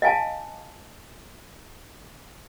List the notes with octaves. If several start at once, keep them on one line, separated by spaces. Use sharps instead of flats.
D#5 F5 G#5 A5